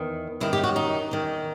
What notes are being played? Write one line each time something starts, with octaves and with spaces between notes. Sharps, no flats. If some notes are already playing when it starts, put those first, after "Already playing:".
Already playing: E2 D#3
F#2 D#3 E4
G4
F#4
D#4
E2 D#3